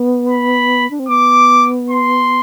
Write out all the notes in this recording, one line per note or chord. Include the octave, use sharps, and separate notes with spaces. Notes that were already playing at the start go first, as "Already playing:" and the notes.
Already playing: B3
B5
D4
C4
B3 D6
C6